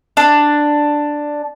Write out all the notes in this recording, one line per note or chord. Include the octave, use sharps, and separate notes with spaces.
D4